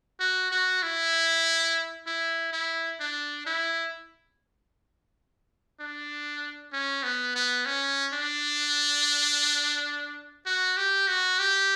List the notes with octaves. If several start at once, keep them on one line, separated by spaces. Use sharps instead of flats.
F#4
F#4
E4
E4
E4
D4
E4
D4
C#4
B3
B3
C#4
D4
F#4
G4
F#4
G4